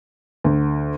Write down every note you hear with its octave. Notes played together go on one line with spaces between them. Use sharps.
D2